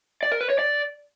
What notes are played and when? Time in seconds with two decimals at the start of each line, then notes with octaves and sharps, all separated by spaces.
0.23 D5
0.32 A#4
0.41 B4
0.50 C#5
0.59 D5